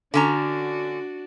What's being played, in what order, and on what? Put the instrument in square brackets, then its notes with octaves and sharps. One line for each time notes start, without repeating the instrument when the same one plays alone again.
[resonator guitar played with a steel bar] D3 C#4 A#5 [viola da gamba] D4 F#4